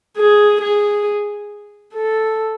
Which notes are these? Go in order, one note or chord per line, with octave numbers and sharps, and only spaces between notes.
G#4
G#4
A4